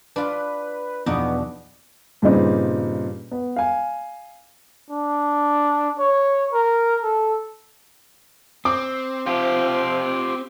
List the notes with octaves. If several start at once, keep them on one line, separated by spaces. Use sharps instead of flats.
D4 F4 B4
E2 B2 F3 B3 D4 D#4 D#5
G2 A#2 C#3 G3 C4 D#4
B3
F5 G#5
D4
C#5
A#4
A4
C4 D6
F3 F4 G4